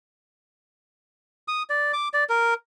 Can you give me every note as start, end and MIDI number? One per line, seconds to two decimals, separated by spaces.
1.48 1.63 87
1.70 1.92 74
1.93 2.08 86
2.14 2.24 74
2.29 2.54 70